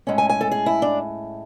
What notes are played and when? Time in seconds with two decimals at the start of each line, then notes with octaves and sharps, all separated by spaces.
0.07 A2 G#3 C#4
0.18 G#5
0.29 G#5
0.41 A4
0.51 G#4
0.66 E4
0.82 D4